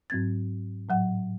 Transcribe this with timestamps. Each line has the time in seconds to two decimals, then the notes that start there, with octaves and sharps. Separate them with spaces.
0.10 G#2 F#3 C4 G#6 A6
0.89 A2 F#3 F#5